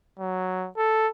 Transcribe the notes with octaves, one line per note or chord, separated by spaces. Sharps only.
F#3
A4